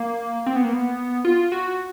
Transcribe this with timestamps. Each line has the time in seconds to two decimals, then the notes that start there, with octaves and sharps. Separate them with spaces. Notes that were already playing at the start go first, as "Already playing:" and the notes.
Already playing: A#3
0.46 C4
0.56 B3
0.65 A#3
0.74 B3
1.25 F4
1.52 F#4